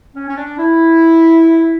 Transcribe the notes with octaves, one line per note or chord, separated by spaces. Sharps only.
C#4
C#4
D4
E4